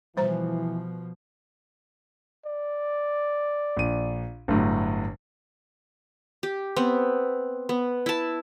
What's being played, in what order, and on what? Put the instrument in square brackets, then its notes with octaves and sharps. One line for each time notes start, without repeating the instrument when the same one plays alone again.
[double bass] B2 F3 [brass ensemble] E3 [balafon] G3 C5 A#5
[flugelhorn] D5
[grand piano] A#1 D#7
G1 A2 F#3
[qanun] G4
B3 C4
B3
E4 A5